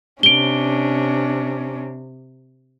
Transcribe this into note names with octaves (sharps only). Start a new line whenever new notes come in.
C3 C#4 D4 D7 G7